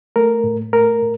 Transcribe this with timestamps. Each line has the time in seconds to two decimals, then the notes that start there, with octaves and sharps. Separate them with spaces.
0.16 A3 A#4
0.44 A2
0.73 A3 A#4
1.02 A2